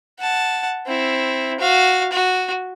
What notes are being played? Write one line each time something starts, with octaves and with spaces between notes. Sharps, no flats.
F#5 A5
C4 E4
F#4 F5
F#4